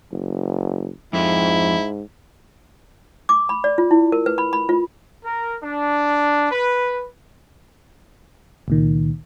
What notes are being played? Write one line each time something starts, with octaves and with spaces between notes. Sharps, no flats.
F#1
F2 G#2 E4
D6
B5
D5
F4
E4
A#4
B4
B5
B5
F4
A#4
D4
B4
C#2 A#2 D#3